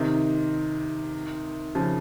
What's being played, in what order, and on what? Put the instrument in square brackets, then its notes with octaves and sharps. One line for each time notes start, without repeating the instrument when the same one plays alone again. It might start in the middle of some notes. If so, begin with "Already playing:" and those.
Already playing: [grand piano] C3 D#3
C#3 F3